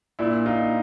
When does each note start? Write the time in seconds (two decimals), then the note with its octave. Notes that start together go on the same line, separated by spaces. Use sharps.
0.19 A#2 D4 E4
0.46 D#4 F4